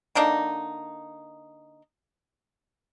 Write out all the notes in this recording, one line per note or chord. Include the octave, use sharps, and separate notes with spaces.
D3 A#3 D4 D#4